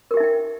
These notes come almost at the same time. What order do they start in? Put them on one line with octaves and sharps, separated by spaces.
A#4 G4 E5 D#4 G5